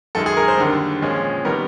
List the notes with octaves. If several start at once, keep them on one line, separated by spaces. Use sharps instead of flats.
F#2 D#3 G#3 A4
G#4
A#4
C5
D#2 D3 G3
A#2 F3 G#3 C#4
D#3 G3 B3 A#4